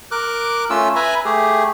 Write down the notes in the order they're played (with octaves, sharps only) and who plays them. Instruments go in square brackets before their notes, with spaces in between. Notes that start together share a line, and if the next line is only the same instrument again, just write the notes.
[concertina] A#4 D6 F#6
A3 C#4 F4 E6
B4 E5 G#5 A#5 B5
A3 G4 G#4